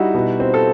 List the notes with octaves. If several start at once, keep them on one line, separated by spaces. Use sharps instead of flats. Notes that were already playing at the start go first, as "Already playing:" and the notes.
Already playing: G3 D#4 E4 F#4
B2
C4
A4